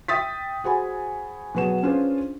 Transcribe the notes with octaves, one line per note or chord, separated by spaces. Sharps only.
E5 G5 D#6 A6 B6
F#4 G#4 C5 F#5 G#5 B5
B2 F#3 B3 G#4 E7
C#4 D4 F4 G#4 B4 C5